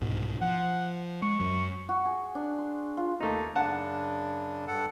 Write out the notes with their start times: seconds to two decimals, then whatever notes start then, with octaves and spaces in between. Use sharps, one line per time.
0.01 C2 G#2 B2
0.41 F3 F#5
1.22 G#3 C#6
1.40 F#2 F#3
1.89 F#4
2.05 G#4
2.35 D4
2.59 C6
2.97 F4
3.20 D#2 A3 A#3 D#4
3.55 F#2 C#3 D4 F#5 A5
4.67 G2 A4 F#5